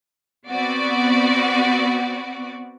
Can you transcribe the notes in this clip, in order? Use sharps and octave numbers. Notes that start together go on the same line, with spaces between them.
B3 C4 F#4 D5